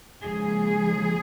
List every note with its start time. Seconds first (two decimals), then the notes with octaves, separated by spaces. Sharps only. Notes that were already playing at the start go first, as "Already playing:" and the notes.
0.22 D#2 C#3 F3 G#3 G#4